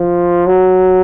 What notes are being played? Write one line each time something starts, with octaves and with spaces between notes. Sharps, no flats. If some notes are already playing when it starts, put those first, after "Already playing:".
Already playing: F3
F#3